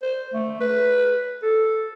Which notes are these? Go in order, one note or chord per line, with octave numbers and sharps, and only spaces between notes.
C5
A3
B4
A4